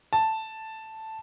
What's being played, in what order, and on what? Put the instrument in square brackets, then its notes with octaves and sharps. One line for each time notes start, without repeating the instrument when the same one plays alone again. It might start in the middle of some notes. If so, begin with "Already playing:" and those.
[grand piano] A5